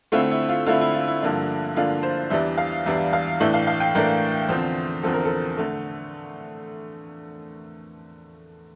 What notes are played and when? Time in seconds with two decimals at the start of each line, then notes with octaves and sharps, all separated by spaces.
0.12 D3 A3 C4 E4 F4
0.31 E4
0.49 F4
0.66 D3 A3 C4 E4 F4
0.81 E4
0.94 F4
1.07 E4
1.22 G2 D3 F3 A#3 D4
1.76 G2 D3 F3 A#3 D4 F4
2.03 C5
2.30 E2 E3 G3 D4 E5
2.58 F5
2.86 E2 E3 G3 D4 E5
3.13 F5
3.40 A2 E3 A3 D4 E5
3.54 F5
3.67 F5
3.80 G5
3.95 A2 E3 A3 D4 A#4
4.48 E2 D3 F3 C4 C5
5.03 E2 D3 F3 C4 A4
5.13 A#4
5.25 A4
5.58 D3 A3